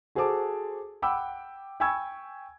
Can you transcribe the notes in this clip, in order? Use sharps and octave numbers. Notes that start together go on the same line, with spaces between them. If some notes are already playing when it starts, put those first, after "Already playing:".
F#4 G#4 A4 C5 A5 D6
F#5 G5 B5 D6 E6
G5 G#5 B5 C#6 E6 G#6